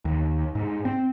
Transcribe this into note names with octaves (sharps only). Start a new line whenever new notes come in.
D#2
G#2
C4